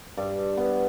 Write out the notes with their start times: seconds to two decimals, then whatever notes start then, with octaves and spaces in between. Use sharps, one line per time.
0.17 G2
0.57 B3